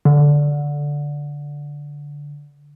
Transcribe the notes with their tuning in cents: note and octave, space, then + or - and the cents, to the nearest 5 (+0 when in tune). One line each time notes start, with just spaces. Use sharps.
D3 -10